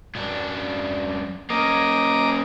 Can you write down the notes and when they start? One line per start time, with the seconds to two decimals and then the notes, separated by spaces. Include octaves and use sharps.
0.15 F#2 D4
1.50 A#3 C#4 D#5 A#5 D6